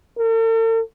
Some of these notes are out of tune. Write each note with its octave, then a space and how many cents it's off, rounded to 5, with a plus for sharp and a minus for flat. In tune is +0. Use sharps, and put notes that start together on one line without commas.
A4 +45